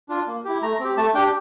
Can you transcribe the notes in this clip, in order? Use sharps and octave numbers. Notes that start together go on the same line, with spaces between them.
D4 F4
A#3
E4 G4
A3 A#5
C4 G4
A3 A5
D4 G4 G5